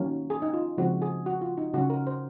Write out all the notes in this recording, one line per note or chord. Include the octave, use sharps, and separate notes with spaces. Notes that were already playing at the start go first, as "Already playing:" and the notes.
Already playing: D#3 F#3 A#3 C#4
G#4
D#4
F4
C#3 F3 G#3 C4 F#4
G#4
F#4
F4
D#4
C#3 F#3 C#4 F#4
A#4
C5